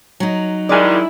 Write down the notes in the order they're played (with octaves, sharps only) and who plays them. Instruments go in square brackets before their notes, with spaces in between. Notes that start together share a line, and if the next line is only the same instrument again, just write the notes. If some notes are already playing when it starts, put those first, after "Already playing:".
[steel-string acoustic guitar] F#3 D#4
[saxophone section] D#3 G3 G#3 [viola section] E4 [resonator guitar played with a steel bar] D5 G#5